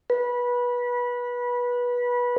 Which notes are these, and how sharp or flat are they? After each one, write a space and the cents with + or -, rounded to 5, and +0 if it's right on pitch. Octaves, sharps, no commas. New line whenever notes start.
B4 -20